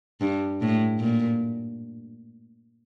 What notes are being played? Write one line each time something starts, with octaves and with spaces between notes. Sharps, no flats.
G2
A2
A#2